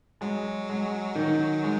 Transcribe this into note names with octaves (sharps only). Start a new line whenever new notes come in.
F#3 G#3
G#3
D#3
G#3